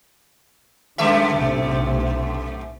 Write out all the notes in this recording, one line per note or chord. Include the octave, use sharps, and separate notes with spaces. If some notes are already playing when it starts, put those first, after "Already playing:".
F#2 D#3 G#3 A3 E5
B1 A2 C3